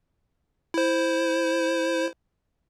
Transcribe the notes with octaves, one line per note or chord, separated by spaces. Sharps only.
E4 C5